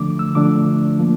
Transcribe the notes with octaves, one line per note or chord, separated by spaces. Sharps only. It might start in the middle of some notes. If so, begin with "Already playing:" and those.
Already playing: D3 F3 A3 D4 D6
E6
D3 F3 A3 D4 D6
F3 A#3